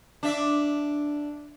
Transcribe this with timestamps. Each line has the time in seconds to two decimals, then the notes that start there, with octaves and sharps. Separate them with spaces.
0.23 D4 E5